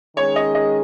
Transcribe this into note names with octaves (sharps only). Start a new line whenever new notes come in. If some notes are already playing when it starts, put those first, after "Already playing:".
D#3 G#3 C#4 G#4 C#5
D#5
D#5